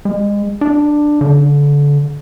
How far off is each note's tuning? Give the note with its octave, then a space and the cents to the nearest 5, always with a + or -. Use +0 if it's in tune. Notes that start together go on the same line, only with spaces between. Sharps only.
G#3 -30
D4 +10
D3 -30